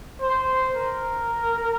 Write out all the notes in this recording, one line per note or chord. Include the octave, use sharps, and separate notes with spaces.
C5
A#4